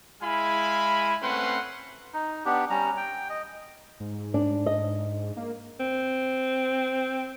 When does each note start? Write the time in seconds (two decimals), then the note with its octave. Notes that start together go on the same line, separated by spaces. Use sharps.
0.23 G#3 E4 F5 G#5 B5
1.22 A3 C4 C#4 B4 F#5 C6
2.14 D#4
2.45 B3 D4 G4
2.70 G3 C#4 A#5
2.97 G5
3.30 D#5
4.00 G#2
4.34 D4
4.66 D#5
5.37 A#3
5.80 C4